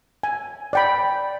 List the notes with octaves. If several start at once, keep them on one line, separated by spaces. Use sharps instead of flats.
G#5
D5 G5 B5